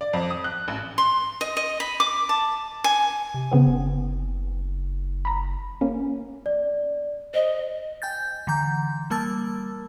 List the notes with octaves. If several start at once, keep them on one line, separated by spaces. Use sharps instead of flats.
D5
F2
D#6
F#6
A1
C6
D#5
D#5
B5
D6
A5
G#5
C3
C#3 B3 C4
F#1
A#5 B5
A#3 C#4
D5
C5 D#5
G5 G#5 G6 A6
D3 E3 A#5 G6
G3 A#3 A#4 A5 E6 A6